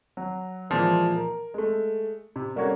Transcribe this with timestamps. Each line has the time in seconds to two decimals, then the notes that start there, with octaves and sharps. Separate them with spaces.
0.17 F#3
0.70 A#2 E3 F3 G#3
1.16 A#4
1.54 G#3 A3
2.36 C3
2.56 G3 A#3 C#4 F#4 A4 C#5